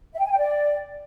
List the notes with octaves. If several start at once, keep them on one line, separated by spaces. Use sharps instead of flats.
E5
G5
G#5
G5
D5